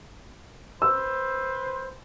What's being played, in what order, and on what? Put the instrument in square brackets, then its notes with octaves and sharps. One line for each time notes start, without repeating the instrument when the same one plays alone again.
[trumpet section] B4 C5 [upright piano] E6